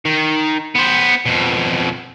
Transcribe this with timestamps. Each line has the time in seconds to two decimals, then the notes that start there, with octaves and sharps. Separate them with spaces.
0.05 D#3
0.75 B3 C5
1.26 F2 B2